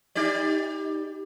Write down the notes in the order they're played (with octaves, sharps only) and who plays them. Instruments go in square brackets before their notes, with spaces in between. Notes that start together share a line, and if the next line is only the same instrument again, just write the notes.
[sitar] D#4 G4 D5